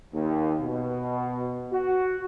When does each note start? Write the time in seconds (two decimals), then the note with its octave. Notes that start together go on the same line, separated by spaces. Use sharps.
0.13 D#2
0.61 B2
1.72 F#4